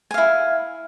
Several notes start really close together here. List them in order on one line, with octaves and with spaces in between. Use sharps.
G#5 F5 E4